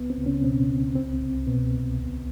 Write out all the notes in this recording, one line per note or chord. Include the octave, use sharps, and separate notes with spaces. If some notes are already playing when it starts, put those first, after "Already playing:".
Already playing: C#2 B3
C4
C#2
C#3 C#4
B2 C4
C#2
C2 C4
C2
B2 B3
C2
D2